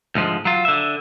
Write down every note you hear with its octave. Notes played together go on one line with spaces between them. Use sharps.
D2 G#2 F3 G#3
F#3 F4
D3 E5